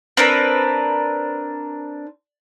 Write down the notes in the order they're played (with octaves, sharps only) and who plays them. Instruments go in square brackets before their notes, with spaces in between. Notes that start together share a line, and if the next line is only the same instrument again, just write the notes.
[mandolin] C4 D4 A#4 B4